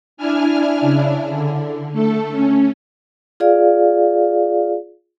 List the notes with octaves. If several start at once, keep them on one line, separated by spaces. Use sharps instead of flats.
D4 E4 G#5 F6
C#3 D4 E4
D3
A3 A4
C#4
F4 G#4 D5 F5